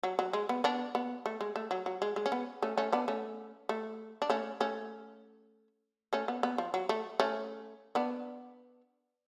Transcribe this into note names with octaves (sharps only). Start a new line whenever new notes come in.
F#3
F#3
G#3
B3
B3 D4
B3
A3
G#3
A3
F#3
F#3
G#3
G#3
C#4
B3
A3 C#4
A3 C#4
B3 D4
A3 C#4
A3
D4
A3 C#4
A3 C#4
A3 C#4
B3
B3
F3
F#3
A3
A3 C#4
B3 D4